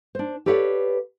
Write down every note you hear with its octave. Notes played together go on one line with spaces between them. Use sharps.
D4 C5
G4 A4 B4 C#5 D5 F5